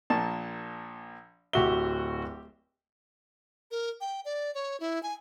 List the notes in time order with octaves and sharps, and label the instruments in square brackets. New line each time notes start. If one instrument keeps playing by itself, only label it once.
[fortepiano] A#1 A#2 A5
[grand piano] D1 F#4 G7 [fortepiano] G4 E5
[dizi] A#4
G5
D5
C#5
E4
G#5